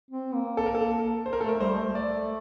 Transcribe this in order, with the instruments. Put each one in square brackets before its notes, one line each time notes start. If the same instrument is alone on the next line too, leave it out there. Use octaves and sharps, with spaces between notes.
[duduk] C4
A#3
[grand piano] A4
A#4
A4
C5
A#4
[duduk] A3 [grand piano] A4
[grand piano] A#4
[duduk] G3 [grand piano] C5
[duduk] A3
[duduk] A3 [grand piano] D5